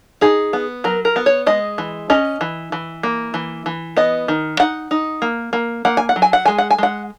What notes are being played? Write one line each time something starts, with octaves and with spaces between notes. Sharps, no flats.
D#4 G#4
B3
F#3 A#4
A#4
B3
C#5
G#3 D#5
E3
C#4 D#5
E3
E3
A#3
E3
E3
B3 D#5
D#3
D#4 F#5
D#4
A#3
A#3
A#3 F#5
G#5
F#5
F#3
G#5
F#5
G#3 G#5
F#5
G#5
G#3 F#5